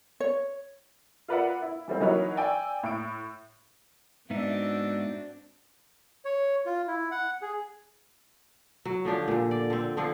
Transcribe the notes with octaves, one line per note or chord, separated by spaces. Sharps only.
C#5
F4 A#4 B4 D5 E5 F#5
E4
E3 G3 A#3 C4
E3 F#3 D#4 A#4 B4 C#5
D5 G5 G#5 E6
A2 D7
G#2 B3 C4 D4 D#4 F#4 E5
C#5
F4
E4
F#5
G#4
F#3
D3 F3 D4 G4
A#2 D3
D5
D3 C4
D3 F3 C4 D4